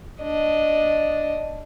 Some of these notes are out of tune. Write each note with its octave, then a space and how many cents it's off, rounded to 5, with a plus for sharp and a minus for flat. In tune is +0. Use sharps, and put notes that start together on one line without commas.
D4 +0 D#5 +0